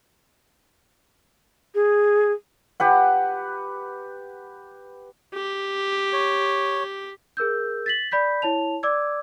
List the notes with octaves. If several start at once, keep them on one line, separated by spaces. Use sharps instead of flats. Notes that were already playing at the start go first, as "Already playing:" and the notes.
G#4
G4 B4 F#5
G4
C#5
G#4 A#4 E6 G6
A6 B6 F#7
D5 B5 G6 B6
E4 C#5 A5 F7
D5 D6 E6 G#6